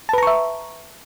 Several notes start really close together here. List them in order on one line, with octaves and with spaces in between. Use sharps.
A5 B4 A#5 C#6 E5